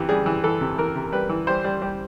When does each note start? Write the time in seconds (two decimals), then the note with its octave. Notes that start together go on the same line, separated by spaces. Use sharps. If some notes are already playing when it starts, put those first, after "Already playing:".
Already playing: C3 E3 G4
0.09 G3 G#4
0.26 E3
0.44 E3 A4
0.61 C3
0.78 E3 A#4
0.95 C3
1.12 G3 B4
1.29 E3
1.47 G3 C5
1.64 G3
1.82 G3